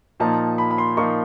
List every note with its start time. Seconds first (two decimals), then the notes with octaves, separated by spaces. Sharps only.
0.20 A#2 F3 A#3 D#4 A5
0.58 B5
0.71 B5
0.78 C6
0.97 A#2 F3 A#3 D#4 C#6